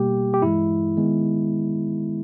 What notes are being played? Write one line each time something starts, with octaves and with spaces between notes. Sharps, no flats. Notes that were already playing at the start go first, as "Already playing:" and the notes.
Already playing: B2 G3 A#3 G4
G4
G2 E3 G#3 E4
D#3 G#3 B3